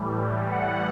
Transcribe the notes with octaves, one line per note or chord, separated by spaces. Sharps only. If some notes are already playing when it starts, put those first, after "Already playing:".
Already playing: A2 E3 G3
F#5